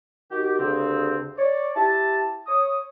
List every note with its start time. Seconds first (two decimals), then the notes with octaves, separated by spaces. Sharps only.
0.30 D#3 F#4 G4
0.59 D2 G2 C#3 C4
1.38 C#5 D5
1.76 E4 G4 A5
2.47 C#5 D#6